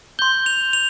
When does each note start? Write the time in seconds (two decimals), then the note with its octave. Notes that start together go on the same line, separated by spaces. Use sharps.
0.19 C6 G6 G7
0.46 F7
0.73 F7